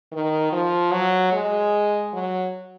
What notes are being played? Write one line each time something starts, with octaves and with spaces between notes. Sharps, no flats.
D#3
F3
F#3
G#3
F#3